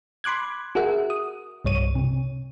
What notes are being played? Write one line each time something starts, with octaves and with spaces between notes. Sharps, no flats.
B5 C6 D6 F#6 G#6
F#4 G#4 A#4 E5 F#5
D#6
C2 G2 C#5 D#7
C3